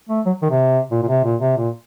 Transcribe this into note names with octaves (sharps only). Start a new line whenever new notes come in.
A3
F#3
D#3
C3
A#2
A#2
C3
A#2
C3
A#2